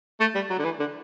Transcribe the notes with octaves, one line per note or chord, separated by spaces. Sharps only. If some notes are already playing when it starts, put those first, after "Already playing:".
A3
G3
F#3
D3
E3
D3